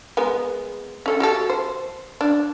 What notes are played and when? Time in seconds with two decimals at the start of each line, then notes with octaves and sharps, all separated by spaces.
0.17 G#3 B3 A#4
1.06 C#4 A4 F#5
1.20 F#4 G4 A4
1.50 C5
2.21 D4